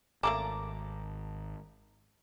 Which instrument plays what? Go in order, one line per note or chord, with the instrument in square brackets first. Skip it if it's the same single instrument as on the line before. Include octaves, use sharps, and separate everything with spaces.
[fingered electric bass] G#1 [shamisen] A3 A#3 C#4 [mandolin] A5 A#5 D6